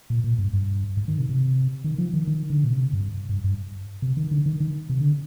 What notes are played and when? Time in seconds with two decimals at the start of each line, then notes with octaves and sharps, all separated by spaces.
0.10 A#2
0.24 A#2
0.39 G2
0.53 G2
0.97 G#2
1.08 D#3
1.19 C3
1.29 C3
1.84 D#3
1.98 F3
2.14 D#3
2.27 D#3
2.50 D3
2.64 A#2
2.72 C3
2.93 G2
3.29 G2
3.44 G2
4.02 C3
4.17 D#3
4.31 D3
4.46 D#3
4.60 D#3
4.90 C3
5.01 D3